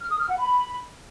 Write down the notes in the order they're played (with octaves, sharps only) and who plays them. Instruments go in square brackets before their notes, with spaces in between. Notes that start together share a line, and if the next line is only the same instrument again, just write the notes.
[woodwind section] F6
D#6
F6
F#5
B5